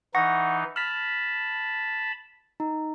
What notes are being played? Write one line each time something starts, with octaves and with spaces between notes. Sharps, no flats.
E3 D#4 F#5 C#6 A#6
A5 B5 F6 B6
D#4